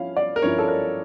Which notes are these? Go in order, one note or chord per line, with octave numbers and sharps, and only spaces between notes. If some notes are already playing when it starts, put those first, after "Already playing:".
Already playing: F3 C#4 E4 F5
D5
A#4
G2 F3 C#4 E4 C#5
A4
A#4